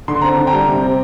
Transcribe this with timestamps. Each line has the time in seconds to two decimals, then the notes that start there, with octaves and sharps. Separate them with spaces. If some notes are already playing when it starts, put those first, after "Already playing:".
0.08 D3 C6
0.21 C4 A#5
0.35 D3 A5
0.47 G5 A#5
0.53 G3
0.68 C3
0.82 C4